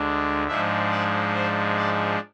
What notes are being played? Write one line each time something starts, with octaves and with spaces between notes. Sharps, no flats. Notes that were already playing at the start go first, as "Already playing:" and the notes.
Already playing: D2 D3 G#3 D4
G#2 F3 G#3 D4 E5
D5
C5
D5